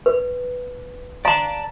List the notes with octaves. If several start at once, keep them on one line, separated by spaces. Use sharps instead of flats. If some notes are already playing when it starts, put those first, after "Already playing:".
B4
D5 F5 A5 A#5